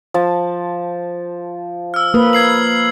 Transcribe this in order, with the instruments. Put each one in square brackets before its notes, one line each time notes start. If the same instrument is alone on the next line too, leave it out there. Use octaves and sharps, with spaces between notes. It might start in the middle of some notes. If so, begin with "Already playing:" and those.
[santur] F3 A5
[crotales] E6 F6
[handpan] A#3 B4 [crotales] D#6
[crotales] G#6 C7 F#7